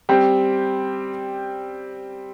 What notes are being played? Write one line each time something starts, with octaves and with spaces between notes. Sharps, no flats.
G3 C4 G4